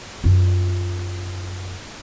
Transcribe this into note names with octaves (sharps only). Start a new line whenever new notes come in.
F#2 F4